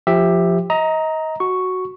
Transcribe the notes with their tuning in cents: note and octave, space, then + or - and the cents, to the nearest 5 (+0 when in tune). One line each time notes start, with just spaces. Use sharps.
F3 +0 G4 +15 E5 +0
D#5 +30 A#5 +0
F#4 +0 C#6 +0